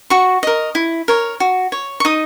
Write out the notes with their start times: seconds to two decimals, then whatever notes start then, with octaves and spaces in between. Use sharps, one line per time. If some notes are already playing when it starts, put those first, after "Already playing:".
0.10 F#4 C#6
0.43 A#4 D#5
0.75 E4
1.08 A#4 C#5
1.40 F#4
1.72 C#5
2.00 C#6
2.05 D#4 D#6